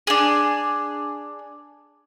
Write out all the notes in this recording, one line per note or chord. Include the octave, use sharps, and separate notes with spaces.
D4 G#4